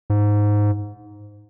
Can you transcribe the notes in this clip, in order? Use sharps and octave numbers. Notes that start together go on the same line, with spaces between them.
G#2